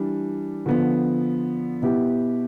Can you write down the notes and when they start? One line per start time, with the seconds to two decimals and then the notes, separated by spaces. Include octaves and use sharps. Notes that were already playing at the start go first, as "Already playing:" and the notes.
Already playing: E3 G3 D4
0.66 D3 F3 B3
1.82 B2 B3 E4 G4